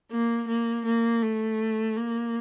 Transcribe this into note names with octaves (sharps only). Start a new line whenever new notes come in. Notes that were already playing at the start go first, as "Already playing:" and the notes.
A#3
A#3
A#3
A3
A#3